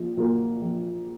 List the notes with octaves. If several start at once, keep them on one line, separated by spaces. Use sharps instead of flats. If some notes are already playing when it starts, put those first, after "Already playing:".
Already playing: A#1 A#2
A#2 F#3 A#3
A#1